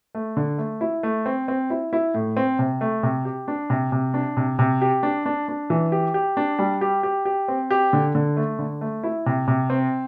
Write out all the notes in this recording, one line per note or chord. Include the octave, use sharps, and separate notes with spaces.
A3
D3
A3
E4
A3
C4
C4
E4
E4
A2
C4
C3
A3
C3
G4
D4
C3
C3
D4
C3
C3
G4
D4
D4
D4
E3
G4
G4
D4
G3
G4
G4
G4
C4
G4
D3
D3
A3
D3
A3
E4
C3
C3
C4